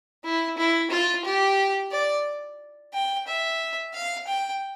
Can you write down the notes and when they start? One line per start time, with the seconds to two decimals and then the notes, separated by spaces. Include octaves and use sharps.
0.24 E4
0.58 E4
0.91 F4
1.25 G4
1.92 D5
2.94 G5
3.27 E5
3.94 F5
4.27 G5